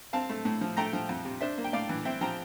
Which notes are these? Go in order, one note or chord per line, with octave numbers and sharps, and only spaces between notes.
C4 F5 A5
A3
A2
F3
A3 G5 A#5
F3
F2
C3
D4 C5 E5
A#3
G5
A2 D5 F5
E3
C4 E5 G5
F3 G5 A#5